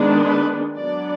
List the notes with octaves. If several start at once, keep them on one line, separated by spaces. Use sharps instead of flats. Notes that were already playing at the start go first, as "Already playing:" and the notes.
Already playing: D#3 G#3 B3 D4
B4
F#3 B3 D4 D5